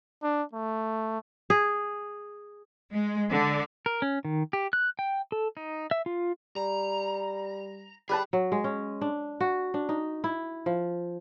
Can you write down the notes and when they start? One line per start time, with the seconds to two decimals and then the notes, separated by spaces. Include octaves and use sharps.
0.23 D4
0.53 A3
1.50 G#4
2.93 G#3
3.31 D3
3.86 A#4
4.02 C#4
4.25 D#3
4.53 G4
4.73 F#6
4.99 G5
5.32 A4
5.57 D#4
5.91 E5
6.06 F4
6.56 G3 A#5
8.09 G3 G#4 B4 A5
8.33 F#3
8.52 G#3
8.64 C#4
9.01 D4
9.41 F#4
9.74 D4
9.89 D#4
10.24 E4
10.66 F3